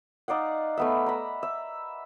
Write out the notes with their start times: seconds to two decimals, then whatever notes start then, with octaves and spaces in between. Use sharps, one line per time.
0.28 D#4 D5 F5 F#5
0.77 A3 B3 E5
1.06 A#5 B5
1.43 E5